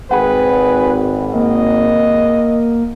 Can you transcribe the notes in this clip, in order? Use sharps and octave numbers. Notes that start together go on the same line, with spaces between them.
G#1 G#4 B4 F#5 G5 B5
A#3 D#5